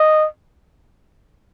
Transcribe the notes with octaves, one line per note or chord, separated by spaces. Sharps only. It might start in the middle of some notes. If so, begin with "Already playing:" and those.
Already playing: D#5